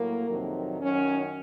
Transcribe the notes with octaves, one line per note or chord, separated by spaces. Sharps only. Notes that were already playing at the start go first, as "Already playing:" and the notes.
Already playing: A2 F#3 A#3
F2 C3 D#3 F#3
F#2 D#3 F#3 C#4